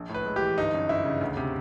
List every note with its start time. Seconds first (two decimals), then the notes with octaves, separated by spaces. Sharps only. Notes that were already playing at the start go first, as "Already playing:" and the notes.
Already playing: A#1
0.09 A2
0.14 B4
0.26 G#3
0.36 G4
0.41 E3
0.58 G1 D#4
0.74 F#2
0.89 G1 E4
1.05 C#3
1.21 D2
1.37 C3